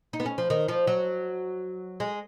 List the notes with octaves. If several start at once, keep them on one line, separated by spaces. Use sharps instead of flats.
D#4
B3
C#4
F3
D#3
F3
F#3
G#3